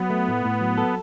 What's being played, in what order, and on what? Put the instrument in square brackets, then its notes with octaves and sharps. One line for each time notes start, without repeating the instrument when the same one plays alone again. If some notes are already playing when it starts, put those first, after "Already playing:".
Already playing: [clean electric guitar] F#3 [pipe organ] B3
[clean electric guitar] A3
A2
A2
F#3
A4